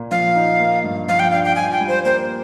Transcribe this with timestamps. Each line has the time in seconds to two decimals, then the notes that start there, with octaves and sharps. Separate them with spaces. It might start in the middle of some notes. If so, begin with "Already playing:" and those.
Already playing: A#2 A#3
0.11 F3 F5
0.35 D#4
0.60 A#3
0.84 G2
1.08 F3 F5
1.19 G5
1.32 D4 F5
1.45 G5
1.56 F4 G#5
1.72 G5
1.81 G3
1.88 C5
2.05 A#3 C5